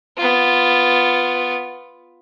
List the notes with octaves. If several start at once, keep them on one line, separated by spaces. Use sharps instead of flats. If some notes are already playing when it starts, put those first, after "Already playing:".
B3 F4